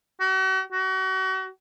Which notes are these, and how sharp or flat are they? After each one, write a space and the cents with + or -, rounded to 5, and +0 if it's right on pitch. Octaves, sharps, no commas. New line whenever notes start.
F#4 +40
F#4 +35